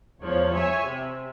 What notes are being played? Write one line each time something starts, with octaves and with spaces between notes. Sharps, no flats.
E2 F3 C#5
C#5 E5 G#5
C3